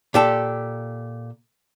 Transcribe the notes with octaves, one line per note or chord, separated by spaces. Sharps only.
A#2 G4 A4